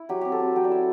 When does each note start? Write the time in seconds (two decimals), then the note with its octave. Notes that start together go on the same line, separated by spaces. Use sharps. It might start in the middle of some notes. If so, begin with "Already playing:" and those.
Already playing: E4
0.09 F#3 G4
0.21 C4 G4
0.32 A4
0.40 C4
0.55 F#3 G5
0.64 D5
0.71 E4 E5